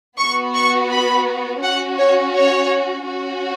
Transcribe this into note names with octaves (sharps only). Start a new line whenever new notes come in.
B3 F#4 C#6
C#6
B5
C#4 F#4 F#5
C#5
C#5
C#4 F#4